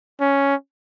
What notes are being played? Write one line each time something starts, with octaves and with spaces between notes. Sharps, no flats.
C#4